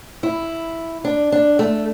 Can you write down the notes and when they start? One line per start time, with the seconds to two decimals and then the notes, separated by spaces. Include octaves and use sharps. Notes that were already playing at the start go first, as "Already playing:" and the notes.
0.23 E4
1.05 D4
1.32 D4
1.59 A3